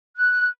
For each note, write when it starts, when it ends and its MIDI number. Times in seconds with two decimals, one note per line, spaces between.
0.18 0.47 90